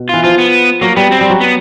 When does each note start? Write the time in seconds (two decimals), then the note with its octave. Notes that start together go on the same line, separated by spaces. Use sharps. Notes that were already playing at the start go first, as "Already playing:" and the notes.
Already playing: B2
0.09 E3 F4
0.24 F3 F4
0.38 B3
0.81 F#3 A#3
0.96 G3 B3
1.11 C4
1.21 G3
1.30 F#3
1.41 B3